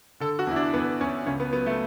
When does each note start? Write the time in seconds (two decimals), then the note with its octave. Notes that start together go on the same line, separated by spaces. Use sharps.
0.20 D3 A4
0.39 F#4
0.47 E2 E4
0.56 D4
0.74 E2 B3
1.01 E2 C#4
1.26 C#2 C#4
1.40 B3
1.53 F#3 B3
1.66 A3